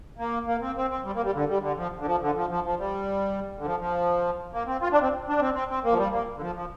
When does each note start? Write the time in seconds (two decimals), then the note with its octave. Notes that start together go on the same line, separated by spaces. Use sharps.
0.18 A#3
0.46 A#3
0.62 C4
0.76 C4
0.90 C4
1.05 G3
1.15 A#3
1.25 G3
1.34 D3
1.48 G3
1.62 D3
1.77 F3
2.00 D3
2.06 F3
2.21 D3
2.36 F3
2.50 F3
2.65 F3
2.79 G3
3.59 D3
3.65 F3
3.80 F3
4.53 A#3
4.67 C4
4.82 F4
4.92 D4
5.02 C4
5.29 D4
5.41 C4
5.54 C4
5.69 C4
5.84 A#3
5.92 F3
5.98 G3
6.13 A#3
6.37 D3
6.42 F3
6.55 F3